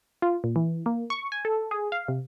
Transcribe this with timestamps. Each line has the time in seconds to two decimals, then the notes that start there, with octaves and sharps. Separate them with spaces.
0.22 F4
0.44 A#2
0.56 E3
0.86 A#3
1.10 C#6
1.32 G#5
1.45 A4
1.71 G#4
1.92 F5
2.08 C3